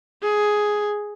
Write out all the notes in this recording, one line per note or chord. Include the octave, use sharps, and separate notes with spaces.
G#4